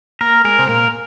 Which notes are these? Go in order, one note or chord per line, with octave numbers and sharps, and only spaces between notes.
A#3 A#4
G#3 A#4
C3
A#2 A#4